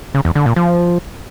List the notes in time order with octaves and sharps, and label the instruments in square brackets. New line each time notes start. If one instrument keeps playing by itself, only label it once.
[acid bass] C#3
E2
D3
A#2
F3